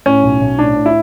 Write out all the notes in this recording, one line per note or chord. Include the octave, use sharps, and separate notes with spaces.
A2 C#4
B1
B1
A2 D4
A2
E4